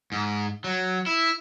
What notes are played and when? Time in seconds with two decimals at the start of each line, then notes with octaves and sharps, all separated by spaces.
0.12 G#2
0.64 F#3
1.06 E4